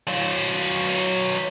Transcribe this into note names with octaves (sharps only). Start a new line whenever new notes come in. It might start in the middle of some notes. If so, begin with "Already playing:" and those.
F#3 C5